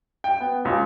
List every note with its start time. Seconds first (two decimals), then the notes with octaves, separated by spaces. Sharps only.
0.24 G5
0.40 B3
0.65 C#2